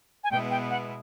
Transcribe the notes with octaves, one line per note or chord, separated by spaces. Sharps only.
G#5
B2 G#3 B3 E4 G5
G5
F#5